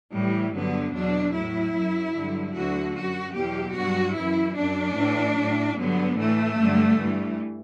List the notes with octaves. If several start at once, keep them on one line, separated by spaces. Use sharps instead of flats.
A2 E3 G3
G2 D3 F#3 B3
E2 B2 F#3 D4
A2 F#3 E4
F#2 F#3
G2 D3 F#3
D2 D3 F#3 F#4
F#2 F#3 F#4
E2 B2 F#3 G4
G2 F#3 F#4
F#2 E3 E4
F#2 F#3 D4
A2 E3
A2 F#3
G2 D3 F#3 B3
A2 E3 A3
G2 D3 F#3
G2 E3